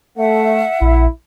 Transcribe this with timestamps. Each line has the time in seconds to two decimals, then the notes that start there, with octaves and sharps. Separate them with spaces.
0.18 A3 E5 F#5
0.81 A#1 E4